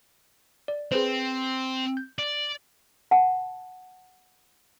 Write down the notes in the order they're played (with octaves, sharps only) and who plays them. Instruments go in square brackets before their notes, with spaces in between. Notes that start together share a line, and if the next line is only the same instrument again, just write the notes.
[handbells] D5
[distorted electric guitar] C4 [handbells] G#4 B4 C5
[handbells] G6
[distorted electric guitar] D5
[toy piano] F#5 A5